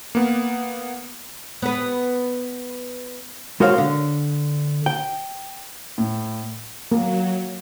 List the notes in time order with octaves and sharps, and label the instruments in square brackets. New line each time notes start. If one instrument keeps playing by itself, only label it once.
[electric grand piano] A#3 B3
[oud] B3 B4
[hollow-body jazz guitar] G#3 F#4 A#4 C5 C#5 F5
D3
G5
[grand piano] A2
[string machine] F#3 [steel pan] A#3